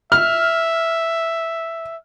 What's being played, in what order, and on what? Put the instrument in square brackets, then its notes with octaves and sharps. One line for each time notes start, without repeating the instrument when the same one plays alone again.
[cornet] E5 [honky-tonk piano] F6